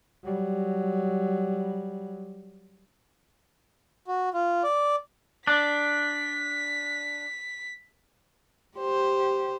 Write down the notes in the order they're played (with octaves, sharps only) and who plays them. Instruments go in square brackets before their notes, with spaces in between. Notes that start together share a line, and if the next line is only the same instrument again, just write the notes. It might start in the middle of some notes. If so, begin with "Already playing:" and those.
[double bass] F#3 G3
[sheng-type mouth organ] F#4
F4
D5
[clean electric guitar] D4 [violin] B6
[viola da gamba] G4 C5